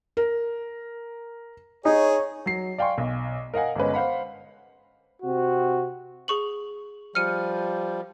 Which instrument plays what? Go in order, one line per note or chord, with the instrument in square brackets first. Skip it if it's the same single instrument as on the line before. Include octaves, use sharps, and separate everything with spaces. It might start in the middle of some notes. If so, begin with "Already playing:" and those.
[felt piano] A#4
[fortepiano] D#4 [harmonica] G#4 [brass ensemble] C#5
[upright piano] F#3 C7
D5 F5 G5 G#5 C6 C#6
B1
A#4 D#5 F5 F#5 G#5
G1 G#3 C#4 B4
C5 F5 F#5 B5
[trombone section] C3 C4 F#4
[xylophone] G#4 C#6 F#7
[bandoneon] F3 G3 [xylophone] F6 C#7 D#7